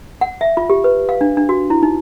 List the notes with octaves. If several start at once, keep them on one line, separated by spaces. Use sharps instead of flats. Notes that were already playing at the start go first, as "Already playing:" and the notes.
F#5
E5
F4
G4
B4
F5
D4
D4
F#4
E4
D#4